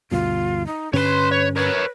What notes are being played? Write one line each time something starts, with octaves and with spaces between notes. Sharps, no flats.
D2 G2 B2 F4
D#4
G2 D3 C#4 B4 C#5 C6
C#5
A#4 B4 C#5